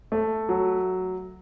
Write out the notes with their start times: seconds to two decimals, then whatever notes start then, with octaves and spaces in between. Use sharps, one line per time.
0.12 A3
0.49 F#3